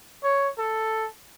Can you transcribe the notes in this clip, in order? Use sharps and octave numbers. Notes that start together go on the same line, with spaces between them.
C#5
A4